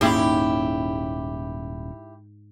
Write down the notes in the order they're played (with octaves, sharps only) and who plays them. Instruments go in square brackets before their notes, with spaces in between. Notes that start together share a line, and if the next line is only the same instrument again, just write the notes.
[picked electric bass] D#1 A#3 C#4 [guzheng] G#2 C6 [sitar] E4 G4